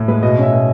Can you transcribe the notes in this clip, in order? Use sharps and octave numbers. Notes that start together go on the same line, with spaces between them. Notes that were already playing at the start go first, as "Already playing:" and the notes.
Already playing: A2
G#3 B4
B2 D#5
C#4 E5
B2